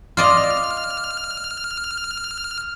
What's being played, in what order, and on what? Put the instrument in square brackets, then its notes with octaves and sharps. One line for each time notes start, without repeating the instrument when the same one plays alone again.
[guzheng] F4 D5 D#5 [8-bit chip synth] F6